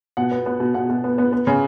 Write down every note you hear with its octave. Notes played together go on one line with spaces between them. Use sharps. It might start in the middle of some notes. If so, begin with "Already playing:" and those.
B2 F#5
B3
B3
B2
B2 F#5
B2
B3
B3
B3
C#3